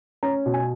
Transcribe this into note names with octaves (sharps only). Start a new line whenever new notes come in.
C#4 A#5
B2
G#5